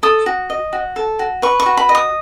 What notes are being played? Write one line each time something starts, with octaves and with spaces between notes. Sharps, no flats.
A4 D#6
F#4
D#5
F#4
A4
F#4
B4 C#6
C#6
F#4
B5
D#5
D#6